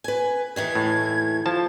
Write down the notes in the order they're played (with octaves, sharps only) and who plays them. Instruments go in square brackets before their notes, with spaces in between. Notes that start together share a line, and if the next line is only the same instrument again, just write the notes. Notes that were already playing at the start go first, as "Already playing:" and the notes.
[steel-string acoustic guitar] B4 G#5
[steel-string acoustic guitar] D#2 D#3 E3 [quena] G#6
[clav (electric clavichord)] A2
F3 A5